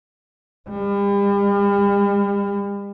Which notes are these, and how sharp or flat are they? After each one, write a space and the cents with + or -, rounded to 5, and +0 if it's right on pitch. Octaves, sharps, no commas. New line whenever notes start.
G3 +40